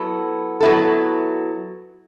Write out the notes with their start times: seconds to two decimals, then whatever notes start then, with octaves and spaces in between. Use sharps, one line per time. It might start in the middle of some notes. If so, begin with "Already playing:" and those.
Already playing: F#3 B3 E4 A4
0.61 F#3 B3 E4 A4